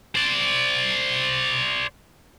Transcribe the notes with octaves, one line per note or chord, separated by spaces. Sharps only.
C5 D5